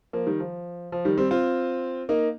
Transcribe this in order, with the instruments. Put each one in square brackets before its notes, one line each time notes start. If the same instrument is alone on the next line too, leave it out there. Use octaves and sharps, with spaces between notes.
[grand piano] F3 A#3
D#3 G3
F3
F3
D#3 G3
G3 C4
C4 F4
A#3 D#4